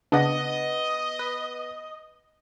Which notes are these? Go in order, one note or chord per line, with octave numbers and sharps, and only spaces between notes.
C#3 B3 D4 D#5 F#5 A#6
B4